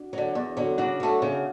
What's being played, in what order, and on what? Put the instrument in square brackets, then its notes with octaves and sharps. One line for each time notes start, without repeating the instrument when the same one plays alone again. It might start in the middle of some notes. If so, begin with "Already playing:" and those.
Already playing: [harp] D4 F#4
[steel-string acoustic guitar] D3 F#3
E2
D3 F#3
[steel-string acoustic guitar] C#3 [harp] D4 F#4
[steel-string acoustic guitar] F#3 A3
C#3